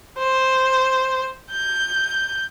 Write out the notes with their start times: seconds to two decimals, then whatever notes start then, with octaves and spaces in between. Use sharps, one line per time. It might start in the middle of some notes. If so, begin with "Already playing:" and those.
0.18 C5
1.51 G6